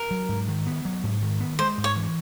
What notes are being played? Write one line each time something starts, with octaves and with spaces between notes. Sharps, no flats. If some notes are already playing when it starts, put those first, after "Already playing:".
Already playing: A#4
F#3
G#2
D#3
B3
F#3
G#2
D#3
B3
G#3 C5
G#2
C#5
E3